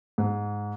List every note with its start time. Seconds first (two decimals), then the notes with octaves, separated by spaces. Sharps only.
0.18 G#2